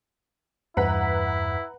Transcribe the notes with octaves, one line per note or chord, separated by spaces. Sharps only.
E2 G2 E4 B4 F#5 A#5 B6